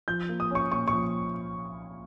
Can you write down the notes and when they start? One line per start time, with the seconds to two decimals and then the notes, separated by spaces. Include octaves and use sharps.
0.08 F3 G6
0.29 A#3
0.40 D#6
0.51 C#4 C#6
0.72 A#2 C#6
0.88 C#6
0.93 F3